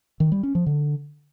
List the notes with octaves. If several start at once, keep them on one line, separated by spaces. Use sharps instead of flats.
D#3
G3
C#4
F3
D3